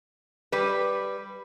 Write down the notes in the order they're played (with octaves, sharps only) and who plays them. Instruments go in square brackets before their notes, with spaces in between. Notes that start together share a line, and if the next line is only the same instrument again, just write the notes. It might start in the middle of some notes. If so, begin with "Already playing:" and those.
[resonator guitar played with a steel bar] G3 B4